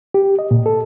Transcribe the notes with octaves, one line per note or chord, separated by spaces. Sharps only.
G4
D#5
A#2
A4